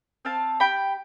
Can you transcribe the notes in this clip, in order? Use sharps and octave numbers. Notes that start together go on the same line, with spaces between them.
C4 F5 A5
G4 G5 B5